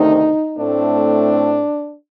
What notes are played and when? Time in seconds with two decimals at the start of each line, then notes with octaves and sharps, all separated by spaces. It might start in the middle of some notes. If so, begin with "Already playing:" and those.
Already playing: D2 C3 D#3 A3 D#4
0.58 A2 A3 C4 D4